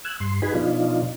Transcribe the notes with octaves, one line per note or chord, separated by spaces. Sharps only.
E6 F#6 G#6
G2 C6
D#4 F#4 G#4 B4 G#5 B5
B2 F3 D4 D#4 F4